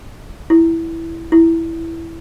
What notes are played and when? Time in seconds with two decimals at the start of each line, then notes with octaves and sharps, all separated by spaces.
0.50 E4
1.32 E4